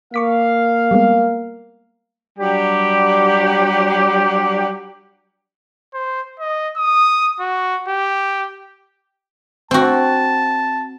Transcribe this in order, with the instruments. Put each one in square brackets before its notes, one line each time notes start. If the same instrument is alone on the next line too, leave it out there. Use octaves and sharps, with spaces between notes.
[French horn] A#3 [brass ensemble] F5 [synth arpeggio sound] C#6 D6 B6
[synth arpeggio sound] G3 G#3 B3
[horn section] F#3 G3 D4 G4
[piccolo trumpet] C5
D#5
D#6
F#4
G4
[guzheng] C4 F#4 [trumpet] A5